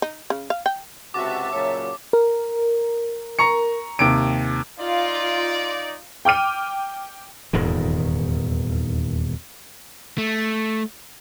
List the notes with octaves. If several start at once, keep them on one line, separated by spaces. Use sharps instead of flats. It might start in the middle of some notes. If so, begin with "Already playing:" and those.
D#4
C#3
F5
G5
C#2 C3 F#4 E5 A5 D6
A#2 C#3 F#3 C#5
A#4
A#5 C#6 C#7
D#2 C3 D7
D#4 F4 D5
G5 D6 F6 D#7
D#1 E2 G#2 D#3
A3